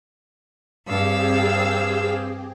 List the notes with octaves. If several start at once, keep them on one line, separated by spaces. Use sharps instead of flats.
G2 C4 G4 G#4 F5 E6